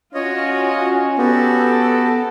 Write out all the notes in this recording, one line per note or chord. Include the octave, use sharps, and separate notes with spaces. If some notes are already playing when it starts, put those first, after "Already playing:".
C#4 F4 F#4 C#5 D#5
B3 F#4 G4 A4 D5